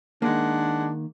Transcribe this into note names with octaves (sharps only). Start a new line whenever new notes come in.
D#3 G#3 A#3 D4 F#5